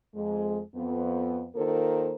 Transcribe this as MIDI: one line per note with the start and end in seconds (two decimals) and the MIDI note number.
0.15 0.60 41
0.15 0.60 56
0.75 1.47 41
0.75 1.47 59
1.55 2.16 51
1.55 2.16 58
1.55 2.16 65
1.55 2.16 69
1.55 2.16 70
1.55 2.16 72